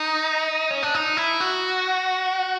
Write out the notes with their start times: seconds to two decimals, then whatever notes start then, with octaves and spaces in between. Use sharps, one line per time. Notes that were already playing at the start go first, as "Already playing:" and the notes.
Already playing: D#4
0.70 C#4
0.83 D4
0.94 D#4
1.17 E4
1.40 F#4